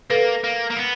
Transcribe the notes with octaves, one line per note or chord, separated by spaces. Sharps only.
A#3 A4 B4
A#3
A#3
B3